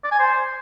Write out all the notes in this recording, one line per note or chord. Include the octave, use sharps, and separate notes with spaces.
D5
G#5
C5